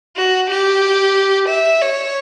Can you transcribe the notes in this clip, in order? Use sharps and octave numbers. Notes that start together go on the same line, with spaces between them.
F#4
G4
E5
C#5